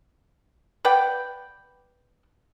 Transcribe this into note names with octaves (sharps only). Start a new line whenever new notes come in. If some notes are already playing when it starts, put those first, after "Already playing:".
B4 D5 F#5 G5